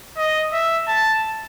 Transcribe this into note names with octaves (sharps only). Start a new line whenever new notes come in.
D#5
E5
A5